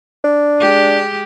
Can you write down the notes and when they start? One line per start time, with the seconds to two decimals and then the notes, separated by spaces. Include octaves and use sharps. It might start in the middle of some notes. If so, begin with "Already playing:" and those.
0.24 D4
0.60 G#3 G4